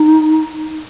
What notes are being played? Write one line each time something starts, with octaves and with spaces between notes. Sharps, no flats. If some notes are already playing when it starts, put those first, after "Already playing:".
Already playing: D#4